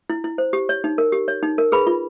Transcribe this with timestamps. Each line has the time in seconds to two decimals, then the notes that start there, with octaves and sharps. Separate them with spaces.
0.10 E4
0.24 E4
0.38 C5
0.53 G4
0.69 C#5
0.84 D#4
0.98 A#4
1.12 G4
1.28 C#5
1.43 D#4
1.58 A#4
1.72 G#4 B4 B5
1.87 F4